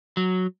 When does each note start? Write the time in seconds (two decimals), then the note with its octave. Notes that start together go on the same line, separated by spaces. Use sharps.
0.17 F#3